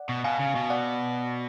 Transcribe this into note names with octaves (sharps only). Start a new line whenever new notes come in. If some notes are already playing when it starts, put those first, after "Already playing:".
Already playing: D5 F#5
B2
B2 F5 G#5
C#3
B2
D5 F#5